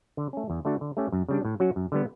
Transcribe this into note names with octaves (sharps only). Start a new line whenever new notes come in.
D3
A3 C#4
E2
D3 A3 D4 F#4
D3
A3 C#4 G4
F#2
C#3 G3 D4
A2
F#3 C#4 F#4
F#2
D3 G3 B3